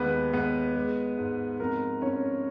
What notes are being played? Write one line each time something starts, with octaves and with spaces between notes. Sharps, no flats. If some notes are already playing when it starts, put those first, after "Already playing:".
Already playing: D#2 G#3 B3 B4
G#3 B3 B4
G#3
G#2
F2 A#4
F2 C#4 C#5